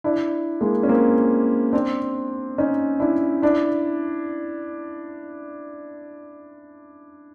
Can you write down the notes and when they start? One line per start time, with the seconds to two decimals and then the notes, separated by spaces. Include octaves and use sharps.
0.04 D4 E4
0.61 G#3 A#3
0.83 C#4
0.88 A#3 C4
1.73 C4 D4
2.58 C#4 D#4
3.00 D4 E4
3.42 D4 E4